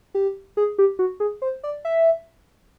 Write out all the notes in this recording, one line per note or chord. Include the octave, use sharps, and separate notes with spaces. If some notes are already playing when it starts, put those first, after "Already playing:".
G4
G#4
G4
F#4
G#4
C5
D5
E5